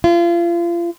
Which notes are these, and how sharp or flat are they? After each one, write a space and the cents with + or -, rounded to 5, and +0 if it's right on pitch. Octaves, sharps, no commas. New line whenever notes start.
F4 -35